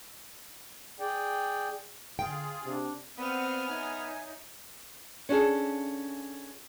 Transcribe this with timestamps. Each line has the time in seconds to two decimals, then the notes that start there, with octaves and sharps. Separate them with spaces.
1.00 G#4 D5 G5
2.19 D3 F4 G#4 G5
2.65 C3 D4
3.18 B3 C4 D5 F5 F#5 D#6 F6
3.67 D#4 C#5 E5 G#5
5.29 C#4 D4 F4 G#4 A4